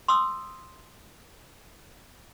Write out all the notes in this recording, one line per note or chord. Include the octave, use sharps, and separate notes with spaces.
C6 D#6 E6